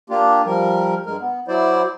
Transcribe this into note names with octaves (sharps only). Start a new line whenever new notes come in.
A#3 D4 F4 G4
F3 G3 A#4
G2 G#3 A#4
B3
F#3 E4 C5 D5